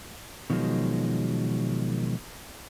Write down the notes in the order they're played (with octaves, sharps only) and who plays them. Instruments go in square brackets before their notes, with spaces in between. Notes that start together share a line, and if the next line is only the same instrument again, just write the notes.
[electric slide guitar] B2 D#3 F3 F#3 G#3